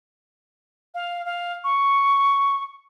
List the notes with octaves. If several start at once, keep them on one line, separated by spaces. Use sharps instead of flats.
F5
F5
C#6